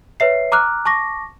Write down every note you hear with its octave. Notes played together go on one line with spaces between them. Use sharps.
B4 C#5 E5 C7
A#5 D6 F6 F#6
A5 C#6 D6 A#6